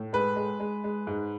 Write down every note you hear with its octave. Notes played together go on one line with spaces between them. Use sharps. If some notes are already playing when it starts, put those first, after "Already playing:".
Already playing: A2
G#3 B4
G#3
G#3
G#3
G#2